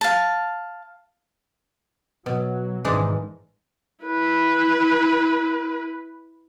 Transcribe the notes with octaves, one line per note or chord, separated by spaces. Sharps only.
F5 A5
B2 F#3
G#1 G#2 D#3 E3 G#3 D4
E4 B4